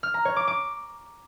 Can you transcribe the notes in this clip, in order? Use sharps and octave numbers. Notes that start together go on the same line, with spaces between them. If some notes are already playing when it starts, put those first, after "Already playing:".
F6
A#5
C#5
D6
D6